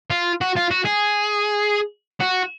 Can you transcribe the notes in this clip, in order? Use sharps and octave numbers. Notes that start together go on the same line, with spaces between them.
F4
F#4
F4
F#4
G#4
F#4